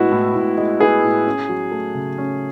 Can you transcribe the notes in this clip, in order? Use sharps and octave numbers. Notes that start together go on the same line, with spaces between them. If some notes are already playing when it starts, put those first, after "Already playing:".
Already playing: A2 G#3 B3 E4 F#4
A2
A2
G#3
B3 G#4
A2
C#4
F#3
A3
C#3
C#4